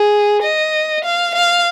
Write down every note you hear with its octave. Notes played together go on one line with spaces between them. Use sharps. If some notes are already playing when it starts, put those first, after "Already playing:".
Already playing: G#4
D#5
F5
F5